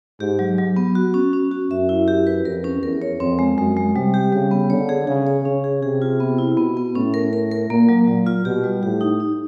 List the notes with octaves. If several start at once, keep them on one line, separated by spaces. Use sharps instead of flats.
G#2 G4
F#3
F#3
B3
F#4
C#4
C#4
F#4
F#2 E5
E4
G4
B4
F2 A#4
C#4
E2 A#4
C#5
F2 C4
G#3
F#2 G#3
G#3
C3 G3
G4
C#3 G3
B3
D3 C#5
G#4
C#3 G#4
C#5
C#3 C#4
G#4
C3 G#4
F4
B3
E4
B2 B3
B3
A2 C#4
A#4
A#4
A#4
A#2 A#3
F#3
A#2 F#3
F4
B2 G4
G3
A2 G4
D#4
D#4